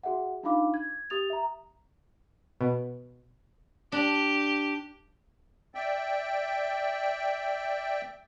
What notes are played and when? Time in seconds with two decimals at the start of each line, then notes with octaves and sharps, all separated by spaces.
0.03 F#4 G#4 E5 F#5
0.43 D4 D#4 F4 F5 B5 D6
0.74 G#6
1.10 G4 D#6 A6 F7
1.30 E5 A#5
2.61 B2
3.92 D4 G4
5.75 D5 E5 G5